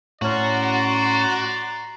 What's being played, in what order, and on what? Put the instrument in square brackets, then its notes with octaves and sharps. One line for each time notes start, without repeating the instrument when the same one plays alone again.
[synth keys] A2 C#4 [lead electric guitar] F#4 [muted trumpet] D5 [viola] A#5 C6